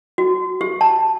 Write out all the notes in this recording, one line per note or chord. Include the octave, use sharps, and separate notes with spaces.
F#4
G4
A5